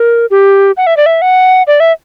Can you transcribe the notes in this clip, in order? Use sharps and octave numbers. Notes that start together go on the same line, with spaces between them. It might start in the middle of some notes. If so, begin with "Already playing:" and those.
Already playing: A#4
G4
F#5
E5
D5
E5
F#5
D5
E5